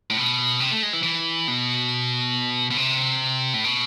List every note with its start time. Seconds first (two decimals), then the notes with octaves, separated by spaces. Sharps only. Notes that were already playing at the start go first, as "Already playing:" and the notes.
0.10 A2
0.17 B2
0.60 C3
0.71 A3
0.83 G#3
0.93 E3
1.03 E3
1.48 B2
2.71 B2
2.77 C3
3.54 A2
3.64 B2